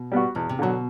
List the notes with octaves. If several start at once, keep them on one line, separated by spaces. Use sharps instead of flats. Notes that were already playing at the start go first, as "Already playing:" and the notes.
Already playing: B2
G3 B3 F#4
E2 B2
C3
B2 D3 F#3